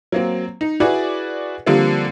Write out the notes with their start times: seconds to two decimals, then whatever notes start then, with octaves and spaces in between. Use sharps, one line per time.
0.12 F#3 A#3 C4
0.61 D#4
0.80 E4 F#4 G#4 B4 D5
1.66 D3 F3 G3 A#3 C4